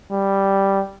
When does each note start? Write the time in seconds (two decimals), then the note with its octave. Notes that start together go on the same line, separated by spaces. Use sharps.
0.11 G3